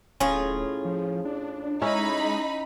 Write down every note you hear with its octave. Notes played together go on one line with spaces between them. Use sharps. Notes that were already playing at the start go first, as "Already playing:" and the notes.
D1 A2 C#4 F4 G#4
F3
D4
G#3 C#4 D#4 E4 B5